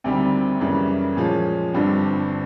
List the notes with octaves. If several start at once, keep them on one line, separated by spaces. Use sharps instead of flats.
D2 C3 D#3 G3 C4
F#2 C#3 E3 G3 A#3
A#2 F3 G#3 C#4
G1 G2 D3 G3 C4